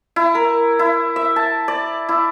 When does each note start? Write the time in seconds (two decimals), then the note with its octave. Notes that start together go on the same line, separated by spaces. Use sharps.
0.16 E4
0.35 A#4
0.79 E4
1.16 E5
1.36 A5
1.68 D5
2.09 E4